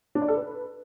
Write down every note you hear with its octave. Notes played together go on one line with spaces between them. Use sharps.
D4
D5
A4
B4